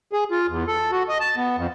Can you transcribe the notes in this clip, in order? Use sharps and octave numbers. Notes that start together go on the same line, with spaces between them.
G#4
F4
E2
A4
F#4
D#5
A5
B3
F2